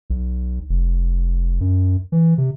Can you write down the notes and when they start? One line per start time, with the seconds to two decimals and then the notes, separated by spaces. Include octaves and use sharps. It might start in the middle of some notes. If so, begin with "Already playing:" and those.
0.10 B1
0.69 F1
1.61 F#2
2.12 E3
2.38 C3